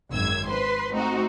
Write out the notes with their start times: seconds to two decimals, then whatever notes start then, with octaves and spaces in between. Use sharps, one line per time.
0.11 G#1 F#2 E6 G#6
0.47 B4 C5 C6
0.92 A3 C4 D#4 F#4